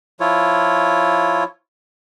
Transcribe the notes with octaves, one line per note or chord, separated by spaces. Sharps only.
F3 E4 F4 C#5